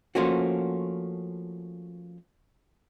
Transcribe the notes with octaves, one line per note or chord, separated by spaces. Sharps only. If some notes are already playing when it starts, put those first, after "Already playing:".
F3 A3 A#3 C#4 F#4